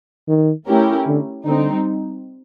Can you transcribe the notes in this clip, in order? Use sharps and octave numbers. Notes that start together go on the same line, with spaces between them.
D#3
A3 C#4 E4 G4 A#4
D3
D3 G3 C4 D#4